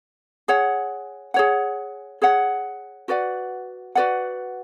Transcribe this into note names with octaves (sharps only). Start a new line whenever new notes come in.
G#4 C#5 F#5
G#4 C#5 F#5
G#4 C#5 F#5
F#4 B4 D5 F#5
F#4 B4 D5 F#5